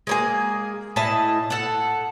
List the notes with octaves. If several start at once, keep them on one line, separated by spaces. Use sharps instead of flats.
G#3 A#3 G#4
A2 E4 D#5 A5
A4 F#5